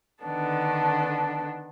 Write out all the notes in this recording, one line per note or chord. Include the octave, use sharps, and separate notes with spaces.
D3 D#3 B3 D4 A4